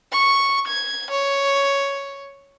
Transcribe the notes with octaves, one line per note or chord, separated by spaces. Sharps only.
C#6
G#6
C#5